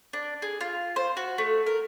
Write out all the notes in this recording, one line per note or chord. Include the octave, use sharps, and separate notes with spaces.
D4
G#4
F4
C5
F#4
A3
A#4